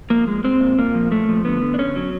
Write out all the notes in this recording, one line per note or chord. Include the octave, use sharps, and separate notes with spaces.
F3 A#3
G#3
G#3 C4
A#2
A#2 A#3
F3
A#2 A3
F3
D3 B3
D3
D4
D3 C#4
F#3